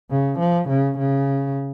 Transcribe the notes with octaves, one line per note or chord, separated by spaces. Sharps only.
C#3
F3
C#3
C#3